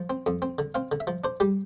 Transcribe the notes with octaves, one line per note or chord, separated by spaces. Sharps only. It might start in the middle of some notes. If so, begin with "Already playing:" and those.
Already playing: F3
C4
F2
C4
D3
C4 F5
D3
E5
F3
D4 C5
G3 G4